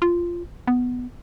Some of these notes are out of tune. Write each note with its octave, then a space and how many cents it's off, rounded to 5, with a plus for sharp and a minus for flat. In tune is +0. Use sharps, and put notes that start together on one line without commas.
F4 -10
B3 +5